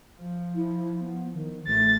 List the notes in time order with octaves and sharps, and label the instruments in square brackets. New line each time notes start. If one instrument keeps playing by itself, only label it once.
[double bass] F3
[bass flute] E4
B3
D#3
[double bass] A1 [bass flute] A3 [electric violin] A6